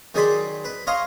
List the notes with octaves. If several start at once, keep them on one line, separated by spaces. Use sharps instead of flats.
D#3 F#3 G#4 D5 B5 C6
B4
C#5 D#5 F5 A#5 C6